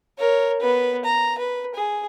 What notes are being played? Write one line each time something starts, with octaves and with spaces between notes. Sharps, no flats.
A#4 C#5
B3 B4
A#5
B4
G#4